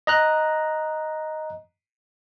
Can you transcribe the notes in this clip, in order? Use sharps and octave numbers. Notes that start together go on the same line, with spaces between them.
D#5 A#5 F#6